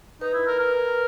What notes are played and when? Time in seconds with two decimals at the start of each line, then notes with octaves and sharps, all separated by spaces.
0.21 D#4 B4
0.34 E4
0.47 A#4
0.59 A#4